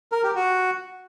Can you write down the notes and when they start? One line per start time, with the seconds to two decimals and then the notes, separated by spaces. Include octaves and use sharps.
0.12 A#4
0.24 G4
0.36 F#4